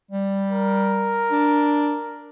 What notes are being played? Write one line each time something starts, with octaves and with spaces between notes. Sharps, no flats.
G3
A#4
D4